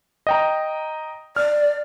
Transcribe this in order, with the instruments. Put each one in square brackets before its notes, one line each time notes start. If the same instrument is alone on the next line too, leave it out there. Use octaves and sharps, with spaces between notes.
[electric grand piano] D#5 G5 A#5
[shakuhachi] D5 [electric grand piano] F6